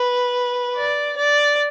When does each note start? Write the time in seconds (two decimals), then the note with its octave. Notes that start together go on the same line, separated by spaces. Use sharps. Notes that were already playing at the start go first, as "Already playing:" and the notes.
Already playing: B4
0.76 D5
1.16 D5